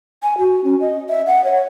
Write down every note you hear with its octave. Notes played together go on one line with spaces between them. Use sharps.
G#5
F#4
C#4
D#5
E5
F#5
C#5